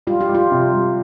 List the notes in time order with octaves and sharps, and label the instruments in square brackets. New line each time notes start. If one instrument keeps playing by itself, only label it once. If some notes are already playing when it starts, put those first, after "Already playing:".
[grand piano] G3 [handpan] F4
[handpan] G4
[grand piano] G3
[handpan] F4
[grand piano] C3
G3